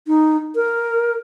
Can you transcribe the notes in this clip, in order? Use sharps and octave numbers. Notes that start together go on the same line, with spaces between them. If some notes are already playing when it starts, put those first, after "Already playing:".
D#4
A#4